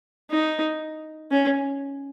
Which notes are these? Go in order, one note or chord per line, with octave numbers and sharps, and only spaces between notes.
D#4
C#4